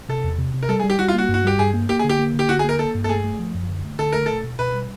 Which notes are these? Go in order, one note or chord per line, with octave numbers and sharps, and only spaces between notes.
C3 A4
E2
C3
C3
A#4
G3 A4
G#4
G3
G4
G3 F#4
F4
A#3 F#4
G2
F#4
G3 G4
G2 G#4
A#3
A#3 G4
G#4
D3
G4
A#3
D3 G4
D3 F#4
G#4
A#3 A#4
A#3 A4
G2
A4
A3 G#4
A3
F3
F#2
D3
A3
D3 A4
A3 A#4
B2 A4
B2
B2 B4
G3